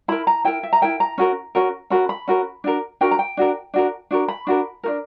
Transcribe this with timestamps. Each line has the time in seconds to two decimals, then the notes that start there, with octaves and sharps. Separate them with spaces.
0.08 E4 A#4 B5
0.27 A#5
0.44 E4 A#4 G5
0.63 E5
0.73 A#5
0.82 E4 A#4 G5
1.00 A#5
1.18 C#4 F#4 A#4
1.55 C#4 F#4 A#4
1.90 C#4 F#4 A#4 B5
2.09 B5
2.28 C#4 F#4 A#4
2.64 D4 F#4 A#4
3.01 D4 F#4 A#4 G5
3.11 A#5
3.19 G5
3.37 D4 F#4 A#4
3.74 D4 F#4 A#4
4.11 D4 F#4 A#4
4.28 B5
4.47 D4 F#4 A#4
4.83 D4 F#4 A#4